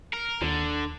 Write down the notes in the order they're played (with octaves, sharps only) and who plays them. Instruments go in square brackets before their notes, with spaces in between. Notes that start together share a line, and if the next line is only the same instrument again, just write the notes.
[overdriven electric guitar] A#4
[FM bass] D#2 [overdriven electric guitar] D3